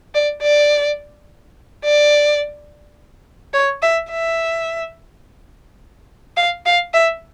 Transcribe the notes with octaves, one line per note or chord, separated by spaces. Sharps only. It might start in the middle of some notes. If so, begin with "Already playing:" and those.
D5
D5
D5
C#5
E5
E5
F5
F5
E5